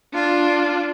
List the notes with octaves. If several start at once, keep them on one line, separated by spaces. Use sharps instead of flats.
D4 F4